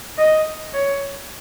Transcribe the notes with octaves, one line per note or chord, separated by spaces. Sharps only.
D#5
C#5